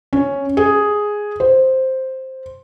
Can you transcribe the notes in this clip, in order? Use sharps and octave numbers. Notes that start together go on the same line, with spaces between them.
C#4
G#4
C5